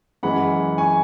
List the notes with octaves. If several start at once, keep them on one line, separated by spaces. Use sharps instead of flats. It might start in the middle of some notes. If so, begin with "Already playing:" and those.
F#2 E3 G#3 F#5 B5
G#5 C#6